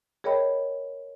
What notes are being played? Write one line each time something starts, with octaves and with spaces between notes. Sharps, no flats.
G#4 A#4 C#5 D#5 G5 B5